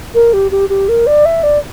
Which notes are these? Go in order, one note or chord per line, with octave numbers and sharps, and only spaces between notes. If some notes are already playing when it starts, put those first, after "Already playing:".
A#4
G4
G4
G4
A#4
D5
E5
D5